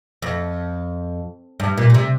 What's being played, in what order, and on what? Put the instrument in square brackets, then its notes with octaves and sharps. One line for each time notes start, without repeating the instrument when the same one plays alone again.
[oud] F2
G2
A#2
A#2
C3